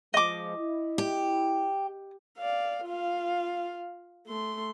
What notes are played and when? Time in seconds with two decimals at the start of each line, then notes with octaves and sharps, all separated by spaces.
0.14 F3 G#3 D#5 D6
0.57 E4
0.98 G4
2.38 D5 F5
2.85 F4 F5
4.27 A3 C6